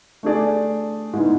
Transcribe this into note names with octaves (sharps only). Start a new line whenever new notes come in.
A3 D4 G#4 D5
G#2 G#3 B3 E4